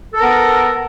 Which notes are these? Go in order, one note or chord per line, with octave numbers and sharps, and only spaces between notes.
B3 A4 A#4